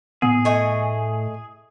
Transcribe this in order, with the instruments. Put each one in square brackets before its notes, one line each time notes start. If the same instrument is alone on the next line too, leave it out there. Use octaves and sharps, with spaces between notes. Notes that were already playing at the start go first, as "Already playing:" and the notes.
[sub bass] A2 [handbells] B3 [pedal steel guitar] G#4
[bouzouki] A3 D#5 G#5